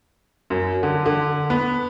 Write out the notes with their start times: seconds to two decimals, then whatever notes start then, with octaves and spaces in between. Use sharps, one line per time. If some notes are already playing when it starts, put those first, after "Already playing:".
0.50 F#2
0.83 D3
1.06 D3
1.50 B3